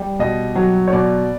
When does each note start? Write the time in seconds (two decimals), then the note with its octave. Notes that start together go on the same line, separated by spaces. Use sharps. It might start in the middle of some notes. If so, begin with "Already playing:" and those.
Already playing: G3
0.19 B2 D#5
0.55 F#3
0.87 C#5
0.93 B2 D5